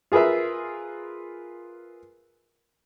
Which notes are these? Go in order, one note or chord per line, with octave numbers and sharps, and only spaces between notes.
F4 G#4 A#4 B4 E5